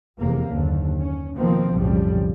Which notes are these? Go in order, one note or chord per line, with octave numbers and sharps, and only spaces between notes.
F1 E2 C3 A#3
F#1 D#2 D3
C#4
B2 D#3 F3 A#3 C4
B1 F2 A2 C#3 F3 G3